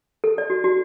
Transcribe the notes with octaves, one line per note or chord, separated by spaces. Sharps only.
A4
D5
F#4
F#4